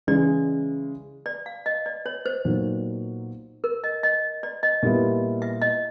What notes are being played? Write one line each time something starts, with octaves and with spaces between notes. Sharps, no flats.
C#3 E3 G#3 C#4 D5
D5
F5
D#5
D5
C#5
C5
A#2 F#3 B3 D#4
A#4
D#5
D#5
D5
D#5
A#2 G3 B3 E4
E5
D#5